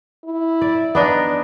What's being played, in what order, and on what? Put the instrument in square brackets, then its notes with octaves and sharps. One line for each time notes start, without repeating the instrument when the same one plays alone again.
[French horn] E4
[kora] D5
B3 D4 D#4